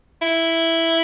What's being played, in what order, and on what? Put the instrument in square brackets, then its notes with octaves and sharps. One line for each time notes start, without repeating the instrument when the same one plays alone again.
[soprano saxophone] E4